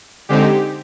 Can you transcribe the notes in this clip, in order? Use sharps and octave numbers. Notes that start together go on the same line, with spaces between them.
D3 G#3 C4 D#4 G4